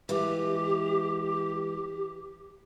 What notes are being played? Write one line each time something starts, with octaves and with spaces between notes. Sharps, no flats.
E3 G#3 F4 G4